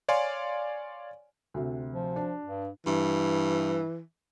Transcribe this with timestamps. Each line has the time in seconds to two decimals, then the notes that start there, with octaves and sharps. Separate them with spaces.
0.08 C#5 D5 F5 G#5 C6
1.54 D2 C3
1.93 F3
2.16 D4
2.45 G2
2.86 G2 E3